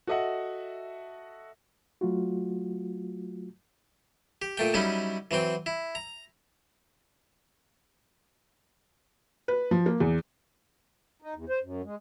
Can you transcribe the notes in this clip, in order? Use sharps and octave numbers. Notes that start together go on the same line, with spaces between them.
F#4 A4 D#5 E5 F#5
F#3 A3 F4 F#4
G4
A#2 A3 G5
F#3 G3 C#4 D#4 E4
E3 F#3 C4 G5
E4
A#5
B4
F3
A#3
E2
D#4
E2
C5
F#2
G#3